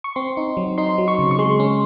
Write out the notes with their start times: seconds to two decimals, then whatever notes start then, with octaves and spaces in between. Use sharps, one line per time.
0.04 C#6
0.16 C4 C6
0.37 D#4
0.57 F#3
0.78 D#4 C6
0.98 F#3
1.08 C#6
1.19 C#3
1.31 C#6
1.39 G#3 C6
1.60 C#4